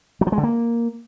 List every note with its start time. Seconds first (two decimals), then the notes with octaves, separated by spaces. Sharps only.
0.21 F#3
0.27 F3
0.32 G#3
0.38 D3
0.43 A#3